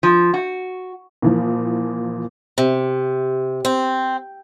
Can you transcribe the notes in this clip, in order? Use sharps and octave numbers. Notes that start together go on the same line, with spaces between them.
F3
F#4
A#2 E3 F3
C3
C4